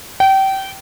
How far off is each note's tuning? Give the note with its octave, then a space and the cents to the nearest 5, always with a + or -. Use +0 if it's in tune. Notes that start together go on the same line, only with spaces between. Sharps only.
G5 -25